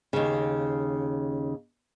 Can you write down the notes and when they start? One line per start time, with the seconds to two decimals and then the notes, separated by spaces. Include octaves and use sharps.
0.13 D#2 C#3